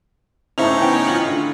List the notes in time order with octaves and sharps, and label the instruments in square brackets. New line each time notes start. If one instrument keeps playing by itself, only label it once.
[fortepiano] A2 C#3 [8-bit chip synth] C#4 D#4 C#5 [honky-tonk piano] E4 C5 F7
[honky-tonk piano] E3 B3 G5
[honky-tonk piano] E3 F6 F#7 [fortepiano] F4
[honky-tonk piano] A2 D3